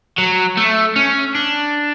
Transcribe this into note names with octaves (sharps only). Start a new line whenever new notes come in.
F#3
A3
C#4
D4